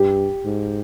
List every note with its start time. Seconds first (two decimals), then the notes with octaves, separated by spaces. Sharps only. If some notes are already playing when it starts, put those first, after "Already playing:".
Already playing: G2 G4
0.45 G#2